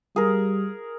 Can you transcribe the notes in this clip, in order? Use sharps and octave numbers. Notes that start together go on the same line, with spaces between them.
G3 G#4 A#4